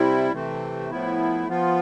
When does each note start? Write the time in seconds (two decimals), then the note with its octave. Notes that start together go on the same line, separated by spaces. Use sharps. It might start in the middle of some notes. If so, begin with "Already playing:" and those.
Already playing: C3 G3 C4 E4
0.33 C3 E3 A3 C4
0.90 A2 F3 B3 E4
1.48 F3 B3 F4